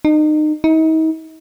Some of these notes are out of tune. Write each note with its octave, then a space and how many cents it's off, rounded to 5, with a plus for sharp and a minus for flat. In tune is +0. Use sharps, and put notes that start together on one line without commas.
D#4 -30
D#4 +40